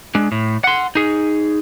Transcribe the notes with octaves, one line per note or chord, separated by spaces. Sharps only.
G#3 D4
A2
F#5 C6
D#4 G#4